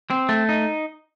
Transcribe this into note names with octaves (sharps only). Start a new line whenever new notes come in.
C4
A3
D#4